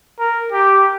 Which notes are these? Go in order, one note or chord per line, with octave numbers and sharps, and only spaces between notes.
A#4
G4